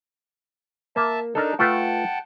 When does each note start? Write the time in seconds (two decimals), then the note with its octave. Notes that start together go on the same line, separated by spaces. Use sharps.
0.96 A#3 E5 A5
1.35 D4 D#4 A4 A#4
1.59 A3 F4 B4 F#5 G5 A5